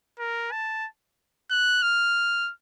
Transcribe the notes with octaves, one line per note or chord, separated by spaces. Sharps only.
A#4
A5
F#6
F6